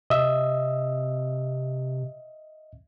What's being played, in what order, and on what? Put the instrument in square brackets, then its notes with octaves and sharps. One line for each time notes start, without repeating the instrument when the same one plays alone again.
[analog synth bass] C3 [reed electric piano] D#5 E5